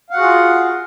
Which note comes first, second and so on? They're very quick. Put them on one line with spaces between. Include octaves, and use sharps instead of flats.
F5 F#5 F#4 G#4 F4